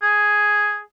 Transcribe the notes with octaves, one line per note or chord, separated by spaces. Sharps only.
G#4